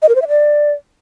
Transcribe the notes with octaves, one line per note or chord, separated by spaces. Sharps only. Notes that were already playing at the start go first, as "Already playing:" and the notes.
D#5
A#4
C5
E5
D5